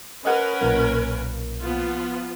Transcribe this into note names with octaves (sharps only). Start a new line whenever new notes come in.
C#4 A#4 B4 D#5 F#5
B1 A#2 A#3
F3 B3 F4